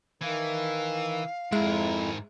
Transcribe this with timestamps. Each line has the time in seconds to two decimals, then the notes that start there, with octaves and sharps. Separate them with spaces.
0.22 D#3 E3 F5
1.52 F2 G#2 G#3 E4 G#4 A#4 E5